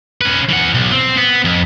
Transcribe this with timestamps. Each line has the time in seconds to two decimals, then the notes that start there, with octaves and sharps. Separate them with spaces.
0.21 C#4 B4
0.50 E3 F#5
0.74 B1
0.92 C4
1.17 B3
1.45 F2